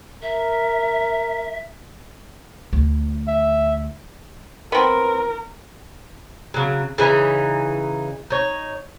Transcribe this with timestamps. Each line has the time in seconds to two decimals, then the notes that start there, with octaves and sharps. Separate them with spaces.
0.22 A#4 E5
2.73 D2
3.28 E5
4.72 B3 C4 A#4
6.54 C#3 F#3
6.98 C#3 E3 D#4
8.30 D#4 C#5